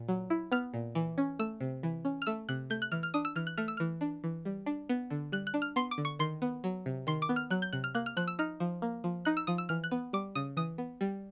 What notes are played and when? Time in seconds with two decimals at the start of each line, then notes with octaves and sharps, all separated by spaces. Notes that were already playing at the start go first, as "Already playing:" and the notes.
Already playing: A#2
0.08 F#3
0.30 E4
0.52 B3 F6
0.74 A#2
0.95 E3
1.18 C#4
1.39 A3 E6
1.60 C3
1.83 E3
2.05 C#4
2.22 F6
2.27 A3 E6
2.49 C3 F#6
2.70 A3 G6
2.82 F#6
2.92 E3 F6
3.03 F6
3.14 D4 D#6
3.25 E6
3.36 E3 F6
3.47 F#6
3.57 A3 F6
3.68 E6
3.77 E3 F6
4.01 D4
4.24 E3
4.45 G3
4.66 D4
4.89 B3
5.10 D3
5.32 G3 F#6
5.47 F#6
5.54 D4
5.62 F6
5.76 B3 C6
5.91 D6
5.98 D3
6.05 C#6
6.19 D#3 C6
6.42 B3
6.64 F#3
6.86 C3
7.07 D#3 C6
7.22 D6
7.29 B3
7.36 F6
7.50 F#3 F#6
7.62 G6
7.73 C3 F#6
7.84 F6
7.95 A#3 F#6
8.06 F6
8.17 F3 F#6
8.27 E6
8.39 D#4 F6
8.60 F3
8.82 A#3
9.04 F3
9.25 D#4 F#6
9.37 E6
9.47 F3 D#6
9.58 E6
9.69 E3 F6
9.84 F#6
9.91 B3
10.13 G3 D6
10.35 C#3 D#6
10.57 E3 D#6
10.78 B3
11.01 G3